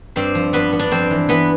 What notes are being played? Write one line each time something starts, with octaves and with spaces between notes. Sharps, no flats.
G2 C4 C5
F3
G2 B3 B4
B3
D4 D5
F2 C4 C5
E3
E3 B3 B4